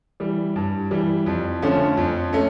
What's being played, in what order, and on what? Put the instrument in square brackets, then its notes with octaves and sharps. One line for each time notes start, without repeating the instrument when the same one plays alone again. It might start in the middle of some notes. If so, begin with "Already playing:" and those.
[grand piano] E3 G3
G2
E3 G3
F2
D3 F3 A3 C#4
F2
A3 C#4